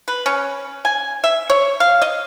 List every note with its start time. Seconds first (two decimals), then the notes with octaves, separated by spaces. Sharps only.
0.08 B4
0.26 C#4
0.85 G#5
1.24 E5
1.50 C#5
1.80 F5
2.02 D#5